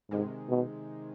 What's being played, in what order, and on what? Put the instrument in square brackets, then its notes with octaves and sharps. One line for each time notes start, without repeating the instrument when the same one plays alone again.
[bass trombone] G#2 [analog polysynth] C3 D#3 G#3
[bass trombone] B2